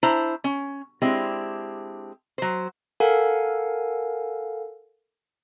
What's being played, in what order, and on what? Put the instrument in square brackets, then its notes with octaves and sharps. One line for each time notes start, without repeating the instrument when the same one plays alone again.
[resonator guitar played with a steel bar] D4 E4 C5 A#5
C#4
G#3 C4 D4 E4 G4
F#3 C5
[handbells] A4 A#4 F5 F#5 G#5